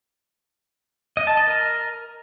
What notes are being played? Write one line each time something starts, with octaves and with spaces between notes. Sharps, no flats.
D#5
A5
D#5
A#4